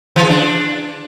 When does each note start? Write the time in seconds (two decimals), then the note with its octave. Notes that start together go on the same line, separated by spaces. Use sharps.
0.16 E3
0.23 G#4
0.29 D4